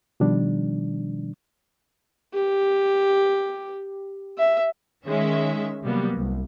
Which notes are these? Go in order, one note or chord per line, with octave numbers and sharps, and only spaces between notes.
B2 D#3 F3 G3 D4
G4
E5
D#3 G#3 C#4 E5
C3 F#3 G3 A#3 B3
C2